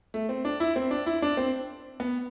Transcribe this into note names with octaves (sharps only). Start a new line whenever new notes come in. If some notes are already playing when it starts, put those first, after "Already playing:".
A3
C4
D4
E4
C4
D4
E4
D4
C4
B3